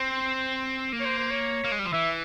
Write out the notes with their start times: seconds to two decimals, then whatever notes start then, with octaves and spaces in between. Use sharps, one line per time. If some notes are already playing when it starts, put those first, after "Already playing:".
Already playing: C4 C5
0.93 A#3
1.00 C#5
1.05 C5
1.18 C5
1.31 C#5
1.64 A#3
1.72 G#3
1.79 G3
1.86 F3
1.93 E3 E5